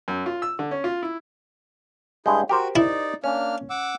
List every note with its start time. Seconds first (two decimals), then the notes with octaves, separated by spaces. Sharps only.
0.08 F#2
0.26 F4
0.42 E6
0.59 D3
0.71 C#4
0.84 F4
1.03 E4
2.26 G2 G#3 E4 G#4 G6
2.49 F#4 G4 A#4 C5
2.76 D#4 E4 D5
3.24 A#3 C#4 D4 F6
3.70 F#5 D6 E6